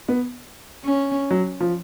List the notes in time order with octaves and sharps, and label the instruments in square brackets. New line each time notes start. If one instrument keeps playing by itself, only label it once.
[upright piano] B3
[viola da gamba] C#4
[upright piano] F#3
F3